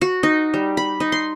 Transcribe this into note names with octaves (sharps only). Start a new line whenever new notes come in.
F#4
D#4
G3
B5
D#4
C6